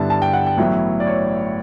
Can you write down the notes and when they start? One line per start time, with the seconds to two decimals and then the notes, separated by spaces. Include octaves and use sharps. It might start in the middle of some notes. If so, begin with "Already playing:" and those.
Already playing: G2 D3 G3 B3 E4 A5
0.10 A5
0.22 G5
0.33 F#5
0.47 G5
0.57 A1 A2 F#3 B3 E4
1.00 D5
1.07 C#5